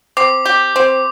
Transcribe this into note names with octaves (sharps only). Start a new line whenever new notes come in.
C4 D6
G4
C4